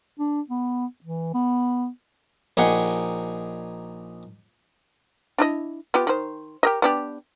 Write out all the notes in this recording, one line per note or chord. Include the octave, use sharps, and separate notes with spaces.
D4
B3
E3
B3
A#1 D#4 G4 G#4 F#5 G5
D4 E4 D#5
B3 F4 G4
D#3 C5
G4 A#4 D#5
B3 D4 G4